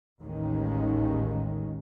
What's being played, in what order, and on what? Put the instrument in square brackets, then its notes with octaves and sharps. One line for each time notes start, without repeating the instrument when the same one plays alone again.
[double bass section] A1 D#2 A2 D#3 G#3 C#4